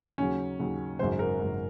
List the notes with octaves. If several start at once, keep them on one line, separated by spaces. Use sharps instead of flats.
D#2 C#3 F#3 C#4
D#2 C#3 F#3
G#1 F#2 C#3 F#3 C5
A#4
G#1 F#2 C#3 F#3